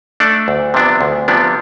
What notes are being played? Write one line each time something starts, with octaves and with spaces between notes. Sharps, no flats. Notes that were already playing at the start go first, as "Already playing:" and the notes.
A3 D4 A4 D5
D2
C3 F3 B3 D4
D2
C3 F3 B3 D4